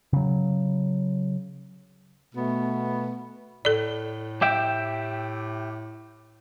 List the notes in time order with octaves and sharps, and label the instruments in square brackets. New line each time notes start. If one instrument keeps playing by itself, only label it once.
[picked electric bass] C#3 F#3
[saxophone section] B2 A3 B3
[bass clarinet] A2 [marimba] A4 D5
[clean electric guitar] G4 E5 G5